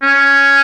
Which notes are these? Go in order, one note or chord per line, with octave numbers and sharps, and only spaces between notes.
C#4